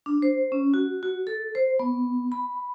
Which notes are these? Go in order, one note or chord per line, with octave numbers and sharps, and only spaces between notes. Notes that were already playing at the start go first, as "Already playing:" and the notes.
D4
C5
C#4
F#4
F#4
A4
C5
B3
B5